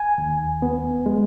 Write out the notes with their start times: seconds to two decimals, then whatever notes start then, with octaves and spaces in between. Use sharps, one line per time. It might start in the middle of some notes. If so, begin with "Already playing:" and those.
Already playing: G#5
0.18 D#2
0.62 B3
1.06 G#3